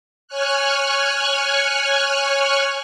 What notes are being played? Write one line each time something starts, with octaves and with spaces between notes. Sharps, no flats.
C#5 G#5 C#6 F6 F#6